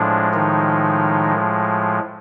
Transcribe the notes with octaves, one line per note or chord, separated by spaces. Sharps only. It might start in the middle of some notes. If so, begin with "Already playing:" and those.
Already playing: A2 F3 G#3 D4
D#3 D#4